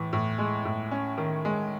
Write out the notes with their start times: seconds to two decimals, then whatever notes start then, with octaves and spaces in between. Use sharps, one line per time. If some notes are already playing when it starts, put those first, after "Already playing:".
Already playing: A2 E3
0.13 A2
0.38 G#3
0.65 A2
0.91 C#4
1.18 D#3
1.45 G#3